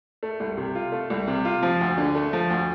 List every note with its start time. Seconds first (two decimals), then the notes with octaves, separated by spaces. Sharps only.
0.23 A3
0.40 C2
0.57 C3
0.75 F4
0.92 A3
1.10 C2
1.28 C3
1.45 F4
1.63 F3
1.81 D2
1.98 D3
2.15 A3
2.33 F3
2.50 D2